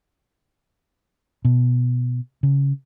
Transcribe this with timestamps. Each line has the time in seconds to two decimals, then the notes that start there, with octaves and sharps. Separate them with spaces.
1.45 B2
2.43 C#3